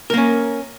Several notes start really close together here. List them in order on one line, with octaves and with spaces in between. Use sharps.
A#4 A#3 C#4